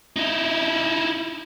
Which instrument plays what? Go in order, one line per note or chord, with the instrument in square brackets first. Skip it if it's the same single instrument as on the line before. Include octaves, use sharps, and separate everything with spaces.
[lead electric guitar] D#4 E4